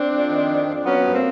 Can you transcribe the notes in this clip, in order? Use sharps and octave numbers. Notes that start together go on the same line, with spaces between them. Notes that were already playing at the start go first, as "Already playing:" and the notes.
Already playing: C4 D4
F2
D#3
F2
F2
D4
F#3 B3 C#4
G2
A#3 C4